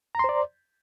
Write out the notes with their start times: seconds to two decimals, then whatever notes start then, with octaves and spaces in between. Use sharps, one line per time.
0.15 A#5
0.19 C6
0.24 C5
0.29 D5